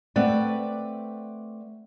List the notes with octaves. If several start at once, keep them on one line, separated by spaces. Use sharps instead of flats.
A3 C4 B4 D5 F#5